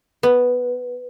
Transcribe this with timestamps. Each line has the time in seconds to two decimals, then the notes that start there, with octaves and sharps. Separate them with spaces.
0.23 B3